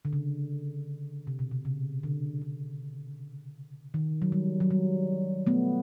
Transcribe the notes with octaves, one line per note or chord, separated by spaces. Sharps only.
D3
C#3
C3
B2
C3
C#3
D3
D3
D#3
F#3
G3
F#3
G3
A3 B3